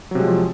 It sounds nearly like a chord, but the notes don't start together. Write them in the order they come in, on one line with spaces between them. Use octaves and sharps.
F#3 C3 G#3 F3